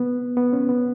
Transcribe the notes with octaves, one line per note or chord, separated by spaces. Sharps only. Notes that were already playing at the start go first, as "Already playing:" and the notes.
Already playing: B3
B3
C#4
B3